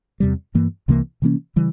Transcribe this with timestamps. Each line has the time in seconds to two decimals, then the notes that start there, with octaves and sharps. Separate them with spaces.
0.20 E2 C3 G3
0.55 G2 E3 A#3
0.88 C2 C3 E3 A#3
1.22 C3 E3 A#3 C#4
1.56 C#3 E3 G3